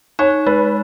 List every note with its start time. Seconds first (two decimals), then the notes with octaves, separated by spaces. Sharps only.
0.19 D#4 C#5
0.47 G#3 B4